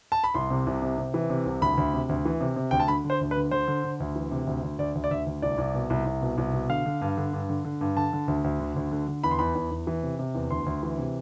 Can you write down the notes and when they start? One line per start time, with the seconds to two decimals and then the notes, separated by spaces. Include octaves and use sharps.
0.12 A5
0.24 B5
0.34 C2 C6
0.50 C3
0.67 C2
0.82 C3
0.98 C3
1.14 E3
1.30 C3
1.46 C2
1.61 D2 B5
1.77 D2
1.94 C3
2.09 D2
2.25 E3
2.41 C3
2.56 C3
2.71 D2 G5
2.80 A5
2.88 D3 B5
3.04 D3
3.10 C5
3.21 D2
3.31 B4
3.36 D3
3.51 D3 C5
3.68 D3
3.84 D3
4.00 D2
4.15 E3
4.31 C3
4.47 D2
4.63 D2
4.79 D2 D5
4.95 D2
5.04 D5
5.11 D2 E5
5.26 D2
5.42 C2 D5
5.58 C2
5.74 B2
5.90 C2
6.05 C2
6.22 B2
6.38 C2
6.53 B2
6.69 D3 F5
6.86 D3
7.01 G2
7.17 D3
7.33 G2
7.49 D3
7.65 D3
7.81 G2
7.96 D3 A5
8.13 D3
8.28 D2
8.44 D2
8.60 D3
8.76 D2
8.91 D3
9.08 D3
9.23 E2 B5
9.31 C6
9.39 E2 B5
9.55 E2
9.71 E2
9.87 E3
10.03 C3
10.19 C3
10.35 E2
10.50 D2 C6
10.66 D2
10.83 E3
10.99 C3